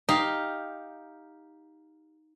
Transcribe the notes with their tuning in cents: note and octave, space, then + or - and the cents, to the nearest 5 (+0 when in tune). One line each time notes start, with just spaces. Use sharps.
D#4 +5 G4 +5 F5 +0